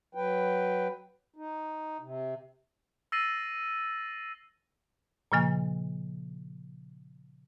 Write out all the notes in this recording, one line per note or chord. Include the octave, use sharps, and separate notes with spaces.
F#3 B4 G5
D#4
C3
E6 A6 A#6 C7 D#7 F#7
A#2 C#3 F3 A#3 G#5